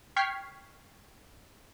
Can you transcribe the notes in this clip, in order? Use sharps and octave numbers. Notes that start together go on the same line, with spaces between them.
G5 C#6 F6 G#6 B6 C7